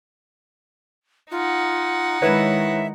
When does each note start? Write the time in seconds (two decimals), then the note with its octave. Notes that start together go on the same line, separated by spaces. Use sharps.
1.31 D#4 F4 F#5
2.22 D#3 G#3 E4 B4 C#5 E5